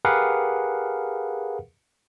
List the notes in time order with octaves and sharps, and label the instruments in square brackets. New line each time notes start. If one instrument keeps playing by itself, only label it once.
[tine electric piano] G4 G#4 A#4 B4 F5 F#5